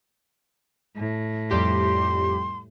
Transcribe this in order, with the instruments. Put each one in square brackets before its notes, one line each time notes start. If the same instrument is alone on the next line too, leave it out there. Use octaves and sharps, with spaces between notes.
[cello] A2
[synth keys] F2 G3 G4 [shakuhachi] C6